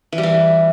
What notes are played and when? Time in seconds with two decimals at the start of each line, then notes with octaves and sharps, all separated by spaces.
0.13 E3
0.18 G3
0.23 E3